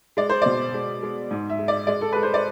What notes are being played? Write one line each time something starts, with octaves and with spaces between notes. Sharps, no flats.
G#3 D5
C5
B2 D5
G#3
G#3
G#2
E5
G#3
D5
G#3 D5
A4
G#3 B4
C5
D5